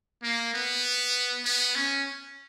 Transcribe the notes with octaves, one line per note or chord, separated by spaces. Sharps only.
A#3
B3
B3
C#4